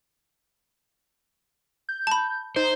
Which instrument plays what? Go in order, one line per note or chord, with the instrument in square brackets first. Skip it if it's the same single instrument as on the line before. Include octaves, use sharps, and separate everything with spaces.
[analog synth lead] G6
[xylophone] A5 B5
[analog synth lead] D#4 [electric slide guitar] C5